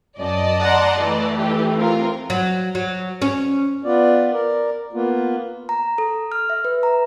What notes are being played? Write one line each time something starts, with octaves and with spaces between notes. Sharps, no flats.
F#2 D5 D#5 A5
F#5 A#5 C6
E3 A3
G4
C4 F4 A#4
F#3
F#3
C#4
B3 F4 D5
A#4 D5
A#3 B3 F4
A#5
A4
F6
E5
B4
A#5